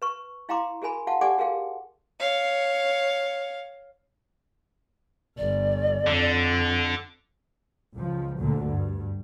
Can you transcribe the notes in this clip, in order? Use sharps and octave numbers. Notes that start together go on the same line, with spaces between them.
B4 C#6
E4 F5 G5 A#5 C6 D6
F#4 G#4 A#4 G#5 B5
F#4 F5 F#5 A5
G4 A4 D5 F#5 G#5 D6
F#4 G#4 A#4 F5 G5
C#5 F5
G1 D5
F2 D3
C#2 F3
D2 A#2 D3
G2